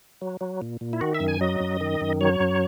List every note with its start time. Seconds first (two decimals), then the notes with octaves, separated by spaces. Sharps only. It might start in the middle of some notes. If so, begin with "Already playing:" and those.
0.21 F#3
0.41 F#3
0.62 A#2
0.81 A#2
0.93 E4
1.01 D#3 F#4
1.14 E5
1.20 F#2
1.28 G#5
1.41 F#3 D#5
1.60 F#2
1.81 D#3
2.01 F#2
2.21 F#3 C#5
2.40 F#2